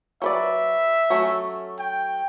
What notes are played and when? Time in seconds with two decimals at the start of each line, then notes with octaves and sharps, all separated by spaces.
0.22 F#3 B4 D5 E5
1.10 F#3 A3 C#4
1.79 G5